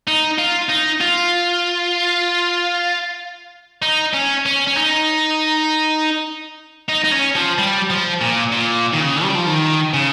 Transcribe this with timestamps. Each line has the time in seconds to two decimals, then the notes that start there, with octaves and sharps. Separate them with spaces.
0.08 D#4
0.39 F4
0.69 D#4
1.01 F4
3.82 D#4
4.14 C#4
4.46 C#4
4.67 C#4
4.77 D#4
6.89 D#4
7.04 D#4
7.12 C#4
7.36 F3
7.58 G3
7.90 F3
8.21 A#2
8.53 A#2
8.93 D#3
9.00 C#3
9.23 G3
9.35 F3
9.46 D#3
9.94 C#3